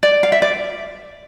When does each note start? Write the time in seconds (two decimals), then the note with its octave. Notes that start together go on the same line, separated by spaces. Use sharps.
0.03 D5
0.23 F5
0.32 E5
0.42 D5